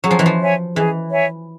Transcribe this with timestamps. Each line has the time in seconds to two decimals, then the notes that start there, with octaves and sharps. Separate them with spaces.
0.03 F#3 G#4
0.11 F3
0.19 E3
0.26 F3
0.39 C#5 E5 G#5
0.75 E3 G#4
1.11 C#5 E5 G#5